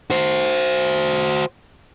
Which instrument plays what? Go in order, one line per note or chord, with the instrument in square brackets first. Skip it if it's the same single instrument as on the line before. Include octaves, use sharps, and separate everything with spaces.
[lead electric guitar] F#4 C5